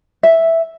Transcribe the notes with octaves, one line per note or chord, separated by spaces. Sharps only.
E5